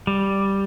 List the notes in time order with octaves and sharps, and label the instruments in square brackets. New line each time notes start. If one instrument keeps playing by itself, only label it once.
[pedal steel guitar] G3